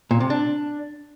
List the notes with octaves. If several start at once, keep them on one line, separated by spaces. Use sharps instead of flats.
A#2
C3
D4